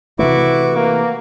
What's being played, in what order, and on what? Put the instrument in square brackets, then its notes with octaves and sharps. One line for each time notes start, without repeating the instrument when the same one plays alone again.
[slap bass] C3 E3 A3 [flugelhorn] E4 [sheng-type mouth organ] F#4 C#6 D6 [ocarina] B4
[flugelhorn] A#3 [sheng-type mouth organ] F#4